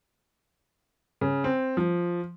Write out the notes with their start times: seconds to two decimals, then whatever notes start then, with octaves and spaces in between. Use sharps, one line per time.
1.21 C#3
1.44 C4
1.77 F3